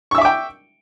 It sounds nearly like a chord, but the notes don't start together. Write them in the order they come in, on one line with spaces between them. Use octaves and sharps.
C#6 E6 E5 D6 G5